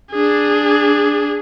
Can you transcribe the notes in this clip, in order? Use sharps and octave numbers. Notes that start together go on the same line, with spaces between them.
D4 G#4